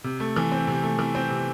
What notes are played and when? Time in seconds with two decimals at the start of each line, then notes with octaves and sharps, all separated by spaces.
0.04 C3
0.20 A3
0.36 E3
0.52 C4
0.68 C3
0.83 A3
0.99 E3
1.15 C4
1.30 C3